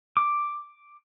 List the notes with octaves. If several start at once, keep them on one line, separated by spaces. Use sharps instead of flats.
D6